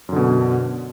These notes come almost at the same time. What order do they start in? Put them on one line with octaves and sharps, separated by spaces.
F#2 D3 B2